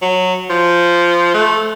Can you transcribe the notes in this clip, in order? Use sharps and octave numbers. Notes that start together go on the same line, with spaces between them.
F#3
F3
A3